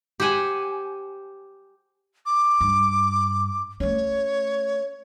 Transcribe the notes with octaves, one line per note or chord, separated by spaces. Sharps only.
G4 C5 F#5 G#5
D6
G2
A3 C#4 C#5